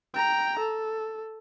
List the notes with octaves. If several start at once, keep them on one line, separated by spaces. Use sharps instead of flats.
G5 A#5
A4